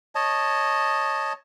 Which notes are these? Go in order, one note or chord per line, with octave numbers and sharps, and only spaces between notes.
C#5 D#5 A5